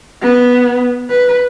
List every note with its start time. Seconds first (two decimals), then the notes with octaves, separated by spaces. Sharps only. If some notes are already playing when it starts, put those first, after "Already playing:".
0.23 B3
1.10 B4